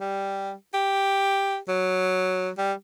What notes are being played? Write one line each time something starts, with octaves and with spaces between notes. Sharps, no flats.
G3
G4
F#3
G3